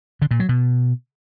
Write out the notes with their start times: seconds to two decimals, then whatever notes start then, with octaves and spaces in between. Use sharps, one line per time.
0.22 D3
0.31 A#2
0.40 F#3
0.49 B2